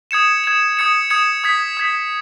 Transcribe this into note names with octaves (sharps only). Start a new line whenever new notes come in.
D#6 G#6 C#7 E7
D#6 G#6 C#7 E7
D#6 G#6 C#7 E7
D#6 G#6 C#7 E7
D#6 G#6 B6
D#6 G#6 B6